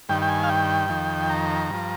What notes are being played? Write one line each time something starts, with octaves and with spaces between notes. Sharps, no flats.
G2 D#3 G5
G5
G#5
F5
G5
F2 D#3
A#5
G2 F3